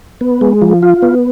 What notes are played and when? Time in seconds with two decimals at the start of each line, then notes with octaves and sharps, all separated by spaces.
0.21 B3
0.41 G#3
0.62 F3
0.82 F4
1.02 B3